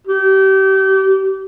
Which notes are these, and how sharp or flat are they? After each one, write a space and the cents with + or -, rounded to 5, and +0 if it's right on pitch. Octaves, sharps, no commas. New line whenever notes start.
G4 -30